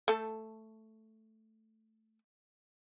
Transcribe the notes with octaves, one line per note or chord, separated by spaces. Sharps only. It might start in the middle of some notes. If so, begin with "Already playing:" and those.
A3 A4